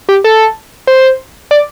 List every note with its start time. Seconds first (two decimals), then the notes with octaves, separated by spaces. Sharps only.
0.09 G4
0.24 A4
0.87 C5
1.51 D5